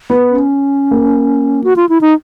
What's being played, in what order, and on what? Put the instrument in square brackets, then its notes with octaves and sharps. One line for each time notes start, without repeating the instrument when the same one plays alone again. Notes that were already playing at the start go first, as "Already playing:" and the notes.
[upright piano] B3
[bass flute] C#4
[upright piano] A#3
[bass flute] F#4
F4
E4
D#4